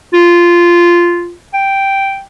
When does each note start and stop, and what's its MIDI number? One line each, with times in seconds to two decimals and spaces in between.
0.14 1.32 65
1.53 2.22 79